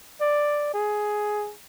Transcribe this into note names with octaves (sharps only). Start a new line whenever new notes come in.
D5
G#4